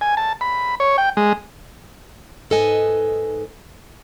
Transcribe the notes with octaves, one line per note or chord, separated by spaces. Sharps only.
G#5
A5
B5
C#5
G5
G#3
G#2 D#4 A4 B4 D#5 G#5